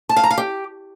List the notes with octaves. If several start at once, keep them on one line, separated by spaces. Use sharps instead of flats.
A5
F5
A#5
F5
G4